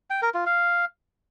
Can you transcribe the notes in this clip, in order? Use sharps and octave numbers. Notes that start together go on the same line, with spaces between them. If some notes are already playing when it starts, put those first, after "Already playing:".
G5
A#4
F4
F5